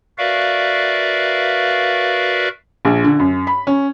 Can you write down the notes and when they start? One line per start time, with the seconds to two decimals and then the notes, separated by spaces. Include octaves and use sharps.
0.18 F#4 A#4 B4 D5 E5 F5
2.85 A#1
3.04 D3
3.20 F#2
3.47 B5
3.67 C#4